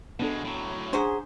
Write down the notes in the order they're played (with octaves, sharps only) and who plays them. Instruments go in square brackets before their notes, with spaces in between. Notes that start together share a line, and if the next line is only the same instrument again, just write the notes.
[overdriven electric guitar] B2 G#3 [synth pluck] B3 D4 A4
[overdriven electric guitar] A2 F#3
[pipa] F#3 C#4 C5 [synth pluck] D4 [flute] G#4